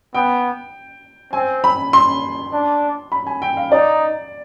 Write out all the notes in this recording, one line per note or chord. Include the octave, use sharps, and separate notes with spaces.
B3 G5
C4 G#5
B5
C6
D4
B5
G#5
G5
F5
D#4 D5